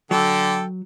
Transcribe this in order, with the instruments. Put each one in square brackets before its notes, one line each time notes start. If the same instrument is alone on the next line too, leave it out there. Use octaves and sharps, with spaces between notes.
[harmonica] D3 A4 G5 [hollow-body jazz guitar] F#3